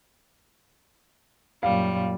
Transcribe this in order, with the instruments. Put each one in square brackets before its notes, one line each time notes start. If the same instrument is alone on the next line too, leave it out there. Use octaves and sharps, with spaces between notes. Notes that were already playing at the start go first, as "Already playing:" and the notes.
[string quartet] F#2 A#2 G3 [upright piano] F5